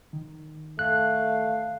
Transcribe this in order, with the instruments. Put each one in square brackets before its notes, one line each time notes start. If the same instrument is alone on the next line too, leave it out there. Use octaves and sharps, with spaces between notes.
[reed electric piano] D#3
[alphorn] A3 [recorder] F5 [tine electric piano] F#6